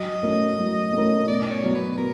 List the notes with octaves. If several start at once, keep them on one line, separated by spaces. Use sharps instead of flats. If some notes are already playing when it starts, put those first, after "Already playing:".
Already playing: F#3 D#5
A3 C#4 F#4 A#4
F#3
A3 C#4 F#4 A#4
B2 D5
C#5
F#3 B3
B4
B2 A#4